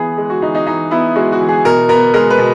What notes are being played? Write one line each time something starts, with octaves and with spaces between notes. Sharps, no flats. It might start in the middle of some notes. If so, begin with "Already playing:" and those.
Already playing: E3 B3 G#4
G#3
F#4
E3 D#4
D#4
E3 D#4
B3 E4
G#3 F#4
F#4
E3
G#4
B2 A#4
B3 A#4
G#3 A#4
B4
B2